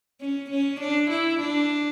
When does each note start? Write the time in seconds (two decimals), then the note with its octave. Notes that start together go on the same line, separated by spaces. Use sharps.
0.21 C#4
0.51 C#4
0.80 D4
1.11 E4
1.40 D4